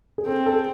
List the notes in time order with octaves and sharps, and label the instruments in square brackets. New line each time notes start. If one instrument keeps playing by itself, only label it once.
[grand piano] G#4
[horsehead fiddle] C4 [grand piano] A4
[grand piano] A4
G#4